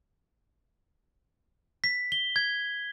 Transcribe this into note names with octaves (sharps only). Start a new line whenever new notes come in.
B6
G7
G#6